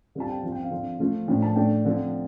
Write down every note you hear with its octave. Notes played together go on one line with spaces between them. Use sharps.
D3 G3 C4 F4 A5
G5
F3 C4 F4
G5
F5
D3 F3 C4 F4
F3 A3 F4
A2 F3 D4 G5
A5
A2 A3 D4 F4 G5
D3 F3 C4